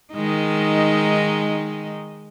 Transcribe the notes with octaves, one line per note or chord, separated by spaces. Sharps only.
D#3 G#3 D#4